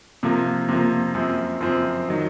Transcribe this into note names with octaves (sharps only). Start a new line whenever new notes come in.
C3 F3 A#3
C3 F3 A#3
F#2 F3 C4
F#2 F3 C4
D#3 F#3